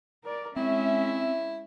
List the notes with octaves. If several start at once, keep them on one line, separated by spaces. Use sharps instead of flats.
A#4 D5
G#3 C4 C#4 E4 E5